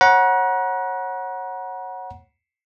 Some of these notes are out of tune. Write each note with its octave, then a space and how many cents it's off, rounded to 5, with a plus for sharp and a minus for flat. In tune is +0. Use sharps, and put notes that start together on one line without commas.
C#5 -30 F#5 +0 A#5 +40